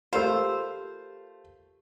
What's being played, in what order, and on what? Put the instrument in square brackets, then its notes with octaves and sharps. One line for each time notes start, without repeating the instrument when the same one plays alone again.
[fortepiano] A3 F5 [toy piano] F4 G4 A#4 [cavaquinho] C5